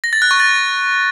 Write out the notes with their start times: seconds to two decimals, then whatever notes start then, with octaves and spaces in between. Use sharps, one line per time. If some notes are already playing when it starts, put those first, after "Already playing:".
0.04 A#6
0.13 A6
0.22 F#6
0.31 C#6
0.40 A6